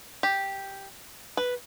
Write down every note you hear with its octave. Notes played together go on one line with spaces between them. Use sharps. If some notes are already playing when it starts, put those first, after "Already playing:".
G4
B4